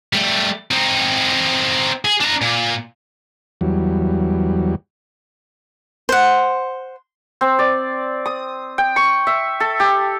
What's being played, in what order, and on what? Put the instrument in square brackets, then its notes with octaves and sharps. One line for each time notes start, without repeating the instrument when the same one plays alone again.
[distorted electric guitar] G3 A3
C4 D#4
G#4
D4 A#5
A#2
[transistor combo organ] E2 F#3 G3
[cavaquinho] C5 F#5
[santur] C4
D5
D#6
G5
C#6
E5
A4
G4